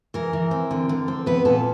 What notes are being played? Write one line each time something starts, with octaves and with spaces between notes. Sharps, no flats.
E3 A#4
E3
C4
D3
D3
C4
B3 B4
A#2 A4